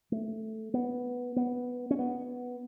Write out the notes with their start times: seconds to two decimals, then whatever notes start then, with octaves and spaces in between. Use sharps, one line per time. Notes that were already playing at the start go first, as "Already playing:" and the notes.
0.12 A3
0.74 B3
1.36 B3
1.91 C#4
1.99 B3